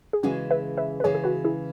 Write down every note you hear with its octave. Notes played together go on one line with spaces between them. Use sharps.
G#4
C#3 E3 G#3 C#4 F#4
B4 E5
B4 E5
B4
C#3 E3 G#3 G#4 C#5
G#4
F#4 B4
E4 G#4